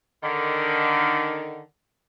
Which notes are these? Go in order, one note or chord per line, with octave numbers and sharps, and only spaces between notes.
D3 D#3